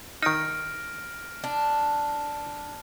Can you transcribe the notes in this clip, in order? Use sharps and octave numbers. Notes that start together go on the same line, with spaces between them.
D#3 D#4 F6 A#6 D7
D4